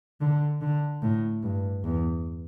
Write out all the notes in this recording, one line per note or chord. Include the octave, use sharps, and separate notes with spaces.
D3
D3
A2
G2
E2